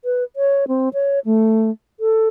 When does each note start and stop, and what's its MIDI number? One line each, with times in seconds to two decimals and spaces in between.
0.05 0.24 71
0.36 0.68 73
0.68 0.89 60
0.94 1.19 73
1.25 1.71 57
2.00 2.28 69